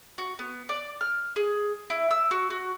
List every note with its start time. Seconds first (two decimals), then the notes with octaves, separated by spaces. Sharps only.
0.18 F#4
0.39 B3
0.69 D5
1.01 F6
1.36 G#4
1.90 E4
2.11 E6
2.31 F#4
2.50 F#4